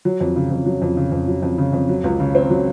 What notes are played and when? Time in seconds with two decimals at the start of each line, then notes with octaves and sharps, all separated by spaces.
0.05 F#3
0.21 F2
0.36 C#3
0.51 F2
0.66 F#3
0.82 F2
0.97 C#3
1.12 F2
1.28 F#3
1.42 F2
1.58 C#3
1.73 F2
1.89 F#3
2.04 C#2
2.20 C#3
2.35 C4
2.50 F#3